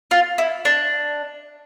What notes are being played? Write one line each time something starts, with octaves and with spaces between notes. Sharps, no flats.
F4
E4
D4